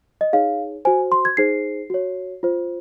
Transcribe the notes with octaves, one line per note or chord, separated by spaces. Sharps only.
D#5
D#4 G#4 C#5 F5
F#4 C5 G#5
C6
G#6
D#4 G#4 C5 C7
F#4 C#5
F4 C5